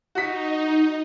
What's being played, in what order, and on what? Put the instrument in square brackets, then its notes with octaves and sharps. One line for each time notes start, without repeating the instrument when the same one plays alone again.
[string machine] D#4 [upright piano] F#4 B6